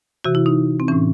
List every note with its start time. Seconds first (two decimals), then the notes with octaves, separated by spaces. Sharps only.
0.24 C3 E3 F#4
0.35 E4
0.46 D#4
0.80 C4
0.88 A2 E3 C#4